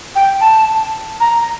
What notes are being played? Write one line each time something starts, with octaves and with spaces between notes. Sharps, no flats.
G5
A5
A#5